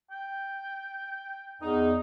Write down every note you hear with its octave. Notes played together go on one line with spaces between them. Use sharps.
G5
E2 D#4